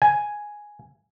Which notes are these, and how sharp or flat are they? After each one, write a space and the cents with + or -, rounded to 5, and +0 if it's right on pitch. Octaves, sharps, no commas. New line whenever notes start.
G#5 +0